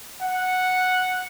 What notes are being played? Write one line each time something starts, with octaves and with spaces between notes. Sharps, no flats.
F#5